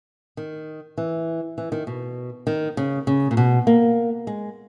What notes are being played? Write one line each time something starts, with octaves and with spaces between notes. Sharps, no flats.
D#3
E3
E3
D#3
B2
D#3
C#3
C#3
A#2
B2
A#3
G#3